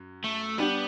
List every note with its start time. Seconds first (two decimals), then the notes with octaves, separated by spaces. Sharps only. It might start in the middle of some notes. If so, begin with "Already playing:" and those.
Already playing: F#2
0.24 A3
0.58 G3 B3 D4 G4